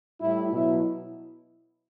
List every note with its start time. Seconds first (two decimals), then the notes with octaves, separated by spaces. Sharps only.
0.21 A2 G3 E4
0.53 B2 F#3 E4